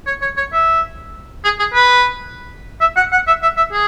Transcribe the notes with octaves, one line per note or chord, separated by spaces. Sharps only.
C#5
C#5
C#5
E5
G#4
G#4
B4
E5
F#5
F#5
E5
E5
E5
G#4